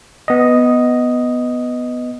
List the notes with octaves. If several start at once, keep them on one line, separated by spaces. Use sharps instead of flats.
B3 D#5